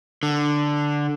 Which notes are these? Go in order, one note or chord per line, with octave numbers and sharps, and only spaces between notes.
D3